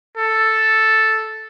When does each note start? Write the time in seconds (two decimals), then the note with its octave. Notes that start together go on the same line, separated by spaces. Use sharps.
0.17 A4